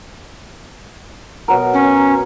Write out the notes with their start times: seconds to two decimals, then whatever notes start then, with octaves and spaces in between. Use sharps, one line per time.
1.48 B2 F#3 A#4
1.74 C#4